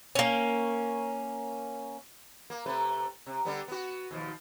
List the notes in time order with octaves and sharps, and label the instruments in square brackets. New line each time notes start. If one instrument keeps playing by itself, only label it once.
[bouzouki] A#3 C#4
[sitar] A#3
C3 A3 B4
C3
D3 G3 B3
B3 F#4
D#2 B2 F3